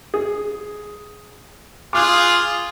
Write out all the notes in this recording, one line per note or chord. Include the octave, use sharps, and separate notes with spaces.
G#4
F4 G#4 F5 D6 F#6